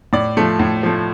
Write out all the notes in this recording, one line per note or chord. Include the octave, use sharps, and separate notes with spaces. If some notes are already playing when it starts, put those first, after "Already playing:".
A2 D5
F3 A3
A2
F3 A3